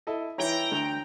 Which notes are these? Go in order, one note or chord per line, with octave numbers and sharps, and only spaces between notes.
E4 A4 D#5
E3 E4 C#5 G5 A#5
D2